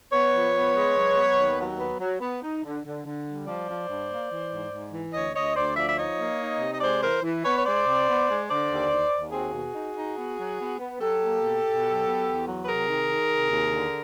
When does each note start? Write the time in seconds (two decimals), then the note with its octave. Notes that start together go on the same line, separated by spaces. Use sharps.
0.11 B3 B4 C#5
0.32 F3
0.54 B3
0.75 G#3
0.96 F#3
1.17 B3
1.37 D#2
1.58 F#3
1.79 B3
1.99 F#3
2.20 B3
2.42 D#4
2.63 D3
2.84 D3
3.05 D3
3.25 G3
3.46 F3 C5 D5
3.68 F3
3.88 G2
4.09 A#3
4.31 E3
4.51 G#2
4.72 G#2
4.93 E3
5.14 D2 C#5 D#5
5.34 D2 C#5 D#5
5.56 D2 C5 D5
5.77 F3 D5 E5
5.89 E5
5.98 D#4 C#5 D#5
6.19 A#3
6.39 D#4
6.60 C3
6.73 D#5
6.81 G#3 C5 D5
7.02 E3 A#4 C5
7.23 E3
7.44 B3 B4 C#5
7.58 C#5
7.65 G#3 C5 D5
7.86 C3
8.07 B3
8.27 G#3
8.48 D3 C5 D5
8.69 D#2
8.90 D#2
9.11 D#2
9.32 C4 F#4 G#4
9.54 B2
9.75 D#4
9.95 D#4
10.16 B3
10.37 F#3
10.59 B3
10.78 B3
11.00 F#3 G4 A4
11.21 A#3
11.41 B2
11.63 B2
11.84 F#3
12.05 B3
12.25 E2
12.46 F#3
12.63 B4
12.67 C3 G#4 A#4
12.88 D#3
13.09 D#3
13.30 C3
13.51 D#2
13.71 D3